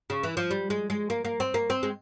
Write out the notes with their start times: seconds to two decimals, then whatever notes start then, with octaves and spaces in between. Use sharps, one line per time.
0.10 C#3
0.23 E3
0.37 F3
0.51 G3
0.70 G#3
0.90 G#3
1.10 A#3
1.25 A#3
1.40 C4
1.54 A#3
1.70 C4
1.83 G#3